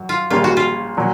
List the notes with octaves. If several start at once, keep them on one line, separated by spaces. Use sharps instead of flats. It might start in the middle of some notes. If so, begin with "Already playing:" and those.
Already playing: F#2
F4
A#1 A#2 G3 A#3 C#4 F4
F#4
F4
A#2 F#3